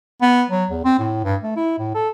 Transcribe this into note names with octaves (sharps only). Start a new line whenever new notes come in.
B3
F#3
E2
C4
A2
G2
A3
E4
A2
A4